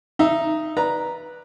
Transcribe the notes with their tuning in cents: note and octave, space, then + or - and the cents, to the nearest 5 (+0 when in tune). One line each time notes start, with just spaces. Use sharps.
D#4 +0 E5 +25 E6 +0
B4 -10 D5 +0 A#5 +0